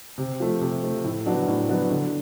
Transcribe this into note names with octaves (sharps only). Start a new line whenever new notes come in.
C3
F3 A3
C3
F3 A3
A2
F#3 B3 D4 F#4
A2
F#3 B3 D4 F#4
D3